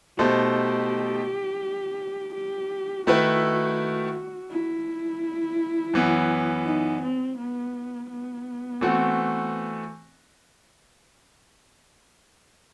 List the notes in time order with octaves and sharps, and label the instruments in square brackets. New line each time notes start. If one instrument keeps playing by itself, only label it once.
[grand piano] B2 A3 D#4 A4 C5 [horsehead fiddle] G4
[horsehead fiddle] G4
[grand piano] D#3 A3 E4 B4 [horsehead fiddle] F#4
[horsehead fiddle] E4
[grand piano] F#2 E3 B3
[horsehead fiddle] D#4
C4
B3
B3
[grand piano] E3 A3 C4 F#4